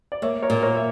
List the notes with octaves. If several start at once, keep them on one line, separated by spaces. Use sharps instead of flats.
D5
A#3 C#5 E5
A#4 C#5
A#2
A#4 C#5
E5